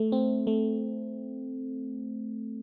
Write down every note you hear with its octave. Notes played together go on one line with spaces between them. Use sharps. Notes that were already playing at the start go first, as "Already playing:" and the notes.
Already playing: A3
C4
A3